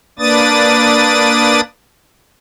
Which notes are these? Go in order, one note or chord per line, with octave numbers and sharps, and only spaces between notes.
A#3 D4 B4 D5 D#6 A6